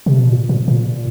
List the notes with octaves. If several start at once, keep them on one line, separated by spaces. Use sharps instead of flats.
C3
B2
A#2
A#2
A#2